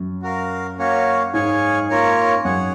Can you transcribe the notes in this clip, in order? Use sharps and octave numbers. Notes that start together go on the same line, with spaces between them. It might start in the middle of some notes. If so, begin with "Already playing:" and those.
Already playing: F#2
F#4 A#4 F5
A#3 C#4 F#4 C#5 F5
G#2 G#4 C#5 F5 G#5
A#3 C#4 F4 A#4 C#5
F#2 G#4 C#5 F#5